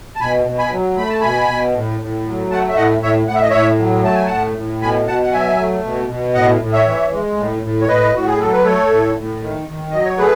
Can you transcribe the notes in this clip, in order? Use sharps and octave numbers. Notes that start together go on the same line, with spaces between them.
A5
B2 G#5 B5
B2
G#5 B5
F#3
A3 B5
A5
B2 G#5 B5
B2
A2
A2
F#3
A3 F#5 A5
E5
A2 D#5 F#5
A2 C#5 E5
A2 F#5
E5
D#5
A2 C#5 E5
F#3
A3 A5
G#5
A2 F#5 A5
A2
B2 G#5 B5
B2 F#5 A5
F#5
F#3 E5 G#5
A3
B2
B2
A2 D#5 F#5
A2
C#5 E5
E3
G#3
A2
A2
C#5
A2 B4 D#5
A2 F#4
G#4
F#3 A4
B4
A3 A4 C#5
A2
A2
D#3
D#3
F#3 D#5
C#5
A3 G#4 B4